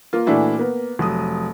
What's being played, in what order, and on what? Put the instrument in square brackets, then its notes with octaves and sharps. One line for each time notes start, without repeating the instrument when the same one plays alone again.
[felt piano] A#3 F4
A#2 E3 A3 D4 E4 F#4
A#3 B3
F1 F#3 D#6